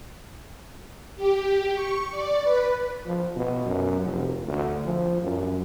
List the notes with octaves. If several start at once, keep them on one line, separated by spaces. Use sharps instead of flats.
G4
C#6
D5
B4
F3
B2
F#2
F1
D2
F3
F#2